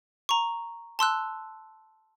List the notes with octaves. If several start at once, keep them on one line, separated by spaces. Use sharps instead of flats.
A#5 C#6
A5 C6 E6 F#6